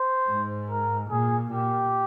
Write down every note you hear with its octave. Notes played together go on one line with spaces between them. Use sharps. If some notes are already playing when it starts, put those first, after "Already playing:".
Already playing: C5
G#2
A#4
A#2 G#4
A#2 G4